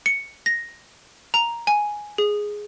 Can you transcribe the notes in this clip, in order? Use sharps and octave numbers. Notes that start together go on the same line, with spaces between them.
C#7
A#6
A#5
G#5
G#4